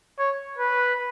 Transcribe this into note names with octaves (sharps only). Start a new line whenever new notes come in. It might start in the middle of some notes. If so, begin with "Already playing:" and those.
C#5
B4